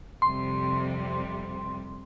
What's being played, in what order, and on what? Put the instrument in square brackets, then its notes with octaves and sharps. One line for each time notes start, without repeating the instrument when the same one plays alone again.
[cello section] F2 C3 G3 [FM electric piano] C6